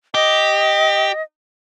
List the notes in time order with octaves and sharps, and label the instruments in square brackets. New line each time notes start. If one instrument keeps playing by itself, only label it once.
[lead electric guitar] G4 [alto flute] D#5